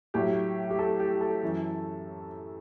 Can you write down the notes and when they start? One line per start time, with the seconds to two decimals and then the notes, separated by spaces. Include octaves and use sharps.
0.14 A2 F#3 G4
0.70 G4
0.79 A4
1.00 G4
1.21 A4
1.43 F#2 E3